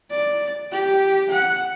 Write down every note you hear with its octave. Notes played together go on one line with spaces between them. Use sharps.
D5
G4
F#5